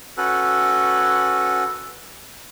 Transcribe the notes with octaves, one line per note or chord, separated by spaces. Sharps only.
C#4 F#4 A4 B4